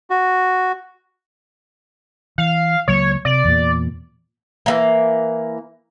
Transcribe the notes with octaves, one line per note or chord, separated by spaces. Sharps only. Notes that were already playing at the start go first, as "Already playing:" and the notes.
F#4
E3 F5
C#2 F#3 A#3 C#5
C3 D5
E2 A#2
E3 G#3 A#3